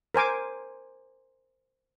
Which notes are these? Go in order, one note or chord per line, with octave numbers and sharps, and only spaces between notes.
A#4 C5 G#5 D6